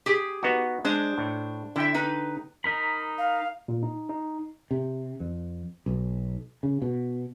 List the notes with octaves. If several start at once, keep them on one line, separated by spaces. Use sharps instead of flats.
G4 G#4
B3 D#4 F#4
G#3 D4 C5
A2
D3 E4 E5 G5
D#4 B4
D#4 A#4 B5
F5
A#2
D#4
D#4
C3
F2
B1
C#3
B2